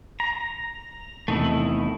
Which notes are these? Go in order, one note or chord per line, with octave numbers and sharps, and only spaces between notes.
A#5
E2 C3 D#3 A3 D#4 E4